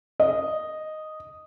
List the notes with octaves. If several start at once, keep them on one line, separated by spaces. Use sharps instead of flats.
D#5